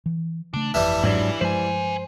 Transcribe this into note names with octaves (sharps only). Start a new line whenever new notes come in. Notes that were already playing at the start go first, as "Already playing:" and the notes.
E3
C#3 A3 D4
G1 F2 E3 G3 A3
G#2 F#3 D4 B4 E5
G2 F3 G#3 B4 C5 G#5